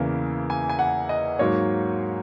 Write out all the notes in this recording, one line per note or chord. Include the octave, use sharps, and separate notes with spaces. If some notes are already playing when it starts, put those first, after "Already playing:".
Already playing: E2 C#3 E3 A#3
G#5
G#5
F#5
D#5
G#2 F#3 A#3 C#5